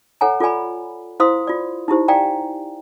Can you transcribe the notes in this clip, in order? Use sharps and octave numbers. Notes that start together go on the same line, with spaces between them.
A4 C#5 F#5 G#5 A#5
F4 A4 D5 G#5 B5
E4 C5 F5 C6 D#6
F4 D5
D#4 E4 G4 C5
D5 F5 G5 G#5 A#5